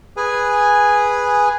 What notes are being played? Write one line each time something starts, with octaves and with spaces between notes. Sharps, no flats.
G#4 B4 G#5